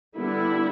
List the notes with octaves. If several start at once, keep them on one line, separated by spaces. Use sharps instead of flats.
D3 G3 B3 E4